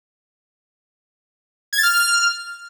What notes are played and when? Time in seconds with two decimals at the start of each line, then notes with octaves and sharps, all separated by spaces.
1.73 G#6
1.78 A6
1.83 F6